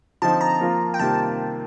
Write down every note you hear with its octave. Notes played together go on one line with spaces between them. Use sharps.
D3 F3 C4 D#4 A5
A#5
F3 A#3 F4
G5
C3 D#3 G3 A#3 F4 A5